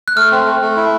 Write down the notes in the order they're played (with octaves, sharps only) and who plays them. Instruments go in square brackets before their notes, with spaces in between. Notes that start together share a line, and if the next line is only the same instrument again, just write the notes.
[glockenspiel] F#6
[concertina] A3 [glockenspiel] F6
[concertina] C4
A3
A3
E4